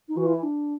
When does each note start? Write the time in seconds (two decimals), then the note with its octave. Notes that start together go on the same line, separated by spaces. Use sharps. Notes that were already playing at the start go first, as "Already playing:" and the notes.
0.08 D#4
0.16 E3 F#4
0.26 F4
0.34 E4
0.43 D4